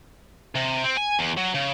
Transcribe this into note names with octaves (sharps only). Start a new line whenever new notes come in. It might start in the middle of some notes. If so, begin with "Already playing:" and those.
C3
C4
G#5
E2
F#3
C#3